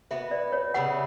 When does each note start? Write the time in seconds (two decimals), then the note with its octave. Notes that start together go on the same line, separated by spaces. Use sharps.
0.11 B3 F#4 B4 E5
0.31 D5
0.52 C#5
0.74 C#3 G3 B3 E4 F#5